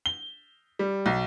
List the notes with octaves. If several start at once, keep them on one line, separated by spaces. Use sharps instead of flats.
G7
G3
B1